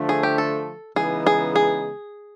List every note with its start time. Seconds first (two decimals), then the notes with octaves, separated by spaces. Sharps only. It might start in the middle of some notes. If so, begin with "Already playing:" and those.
Already playing: D3 F3 A3
0.09 G#4
0.23 G4
0.38 A4
0.96 C#3 E3 G#3 B3 D#4 G#4
1.27 G#4
1.56 G#4